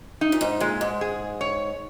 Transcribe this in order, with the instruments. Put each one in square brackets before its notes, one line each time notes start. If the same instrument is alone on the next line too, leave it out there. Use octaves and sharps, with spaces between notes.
[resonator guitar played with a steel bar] D#4
[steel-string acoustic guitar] A#2
G#2
[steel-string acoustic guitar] A#2 [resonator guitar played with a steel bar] G#3
[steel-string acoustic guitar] G#2
[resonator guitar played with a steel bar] G#4
C#5